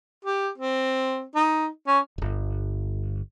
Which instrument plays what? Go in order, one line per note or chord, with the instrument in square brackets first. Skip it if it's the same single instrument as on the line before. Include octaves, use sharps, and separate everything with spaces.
[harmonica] G4
C4
D#4
C#4
[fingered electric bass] D1 G1